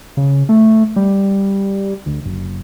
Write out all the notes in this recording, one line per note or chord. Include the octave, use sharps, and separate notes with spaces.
C#3
A3
G3
D2
F#1